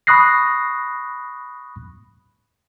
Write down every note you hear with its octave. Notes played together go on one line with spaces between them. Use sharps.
B5 C#6 D#6 F#6 A#6 C7